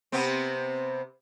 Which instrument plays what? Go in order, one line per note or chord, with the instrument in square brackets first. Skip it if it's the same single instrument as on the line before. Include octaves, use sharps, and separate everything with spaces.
[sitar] C3 B3 C4